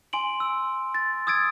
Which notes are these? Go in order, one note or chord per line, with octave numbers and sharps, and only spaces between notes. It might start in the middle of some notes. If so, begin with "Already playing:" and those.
G#5 C6 D7 F#7
E6
A6
D#6 E6 G#6 A6 D7